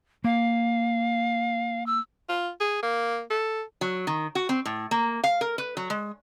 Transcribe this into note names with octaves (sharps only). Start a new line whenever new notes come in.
A#3 F5
E6
F4
G#4
A#3
A4
F#3
D#3
F#4
C4
A2
A#3
F5
A#4
B4
F#3
G#3